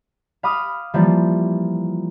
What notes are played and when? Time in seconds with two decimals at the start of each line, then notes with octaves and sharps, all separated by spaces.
0.43 F5 B5 D6 D#6 F6
0.94 E3 F3 G3 A#3